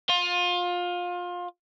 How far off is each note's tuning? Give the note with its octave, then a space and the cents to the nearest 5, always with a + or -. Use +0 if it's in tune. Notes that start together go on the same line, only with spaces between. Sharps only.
F4 +25